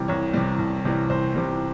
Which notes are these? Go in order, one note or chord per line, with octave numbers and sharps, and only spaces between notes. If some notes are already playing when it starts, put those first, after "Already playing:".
Already playing: C3 E3 G3
C2 C#5
C3 E3 G3
C2
C3 E3 G3
C2 C5
C3 E3 G3